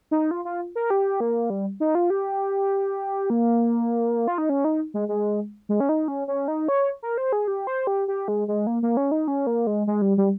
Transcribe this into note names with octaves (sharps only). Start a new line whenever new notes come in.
D#4
F4
F4
A#4
G4
A#3
G3
D#4
F4
G4
A#3
F4
D#4
C#4
D#4
G#3
G#3
G#3
C#4
D#4
C#4
C#4
D#4
C#5
A#4
C5
G#4
G4
C5
G4
G4
G#3
G#3
A#3
A#3
C#4
D#4
C#4
A#3
G#3
G#3
G3
G3